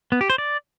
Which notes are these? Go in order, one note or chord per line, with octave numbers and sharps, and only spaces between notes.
B3
G4
C5
D5